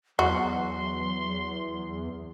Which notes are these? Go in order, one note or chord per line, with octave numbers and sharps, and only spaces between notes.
E2 F#3 F#4 C6